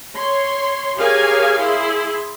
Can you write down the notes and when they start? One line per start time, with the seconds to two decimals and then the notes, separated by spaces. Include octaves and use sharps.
0.15 C#5 C6
0.97 G4 G#4 A#4 C#5 F5 G#5
1.59 E4 G#4 C6